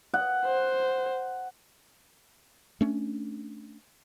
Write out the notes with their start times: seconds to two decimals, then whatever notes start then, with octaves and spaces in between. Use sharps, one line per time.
0.14 F#5
0.45 C5
2.81 A3 C#4 D4